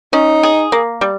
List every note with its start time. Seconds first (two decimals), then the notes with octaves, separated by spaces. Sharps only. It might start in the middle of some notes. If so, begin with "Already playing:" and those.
0.13 C#4 D#4
0.43 G#4
0.72 A#3
1.01 G3